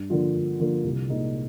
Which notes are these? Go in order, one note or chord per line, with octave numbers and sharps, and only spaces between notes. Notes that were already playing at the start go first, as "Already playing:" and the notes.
Already playing: G2
D3 F3 A#3 F4
G2
D3 F3 A#3 F4
C2
A#2 G#3 D#4